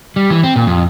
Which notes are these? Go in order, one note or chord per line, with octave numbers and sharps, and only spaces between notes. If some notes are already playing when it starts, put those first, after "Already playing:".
G3
E3
C4
A#2
F2